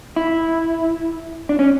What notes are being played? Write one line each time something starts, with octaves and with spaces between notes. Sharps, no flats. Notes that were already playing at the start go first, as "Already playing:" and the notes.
E4
D4
C#4